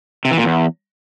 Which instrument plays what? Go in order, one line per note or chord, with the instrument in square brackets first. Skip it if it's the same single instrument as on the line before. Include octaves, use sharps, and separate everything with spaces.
[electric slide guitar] C3
E3
A#2
E2